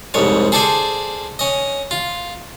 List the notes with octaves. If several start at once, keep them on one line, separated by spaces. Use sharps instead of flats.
C2 F2 G#2 C#5
G#4 A4 C5 D5 G#5
C#4 D#5
F4